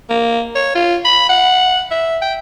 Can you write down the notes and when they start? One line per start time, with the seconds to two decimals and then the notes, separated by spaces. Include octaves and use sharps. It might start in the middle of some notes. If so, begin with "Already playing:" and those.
0.10 A#3
0.55 C#5
0.75 F4
1.05 B5
1.29 F#5
1.91 E5
2.22 G5